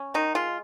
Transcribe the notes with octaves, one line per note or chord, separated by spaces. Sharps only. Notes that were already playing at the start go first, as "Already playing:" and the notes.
Already playing: C#4
D#3 D#4
G#3 F4